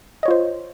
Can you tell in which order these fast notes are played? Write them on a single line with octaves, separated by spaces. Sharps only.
D#5 C#5 F4 C5